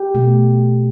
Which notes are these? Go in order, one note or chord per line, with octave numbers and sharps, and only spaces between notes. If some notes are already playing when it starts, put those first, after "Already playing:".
Already playing: G4
B2 A3